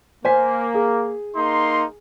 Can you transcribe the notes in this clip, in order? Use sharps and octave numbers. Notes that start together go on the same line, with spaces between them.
A#3 C5 G#5 B6
G#4
A#3 D#4 C6